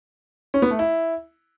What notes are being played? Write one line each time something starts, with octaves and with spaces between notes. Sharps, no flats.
C#4
B3
A3
E4